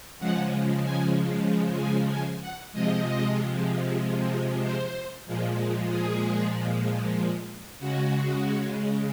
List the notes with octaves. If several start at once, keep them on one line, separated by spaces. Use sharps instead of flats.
C#3 F3 G#3 F#5
G#5
G#5
G#5
F#5
C3 F3 G#3 D#5
C5
A#2 F3 G#3
G#4
C#3 G#3 F#4